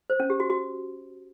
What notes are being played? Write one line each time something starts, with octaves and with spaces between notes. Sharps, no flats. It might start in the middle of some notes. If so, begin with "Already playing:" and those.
C5
C#4
G4
F#4
F#4